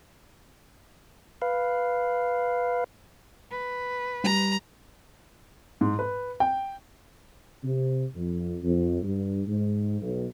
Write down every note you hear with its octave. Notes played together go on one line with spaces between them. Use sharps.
B4 F5
B4
G3 A#5
G#2
B4
G5
C3
F2
F2
G2
G#2
B1